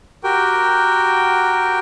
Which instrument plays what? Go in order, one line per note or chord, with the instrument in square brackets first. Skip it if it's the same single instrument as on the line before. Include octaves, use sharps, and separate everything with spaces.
[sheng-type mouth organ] F#4 G4 A#4 G5